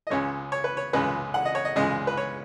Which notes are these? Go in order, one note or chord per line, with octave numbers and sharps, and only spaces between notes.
D#5
C#2 C#3 G#3 C#5
C#5
B4
C#5
C#2 C#3 G#3 B4
F#5
D#5
C#5
D#5
C#2 C#3 G#3 D#5
B4
C#5